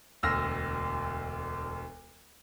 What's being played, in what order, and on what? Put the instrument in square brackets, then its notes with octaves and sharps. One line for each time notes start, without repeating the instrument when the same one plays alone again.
[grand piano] E1 D2 E6 F6 A#6